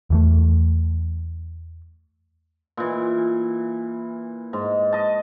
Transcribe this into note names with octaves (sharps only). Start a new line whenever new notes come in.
E2 E3 A3
A#2 E3
G#2
D#5 A5